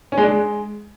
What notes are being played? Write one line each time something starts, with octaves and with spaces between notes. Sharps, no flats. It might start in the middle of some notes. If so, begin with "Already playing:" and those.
C#4
G#3
D4
G#3